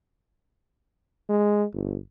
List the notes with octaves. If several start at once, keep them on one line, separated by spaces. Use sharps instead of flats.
G#3
G1